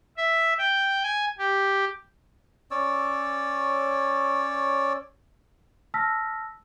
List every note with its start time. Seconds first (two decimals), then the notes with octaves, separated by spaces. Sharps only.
0.17 E5
0.58 G5
1.03 G#5
1.38 G4
2.71 C#4 C#5 D5 E6
5.94 A5 E6 F6 A#6 B6